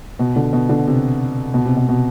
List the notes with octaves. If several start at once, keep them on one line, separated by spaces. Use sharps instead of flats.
B2
D3
B2
D3
C3
B2
C3
B2
B2